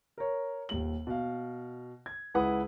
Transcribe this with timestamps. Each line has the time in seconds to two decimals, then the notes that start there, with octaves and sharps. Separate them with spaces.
0.18 A#4 C#5
0.69 D#1 D#2 F#7
1.07 B2 F5
2.06 G#6
2.34 C#2 E4 B4 F#5 D#6